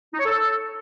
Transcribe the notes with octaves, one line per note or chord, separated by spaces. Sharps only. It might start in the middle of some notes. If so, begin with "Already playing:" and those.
D#4
C#5
A4